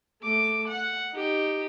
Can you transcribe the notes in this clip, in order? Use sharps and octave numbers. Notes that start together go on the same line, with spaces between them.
A3 D6
F#5
D#4 G4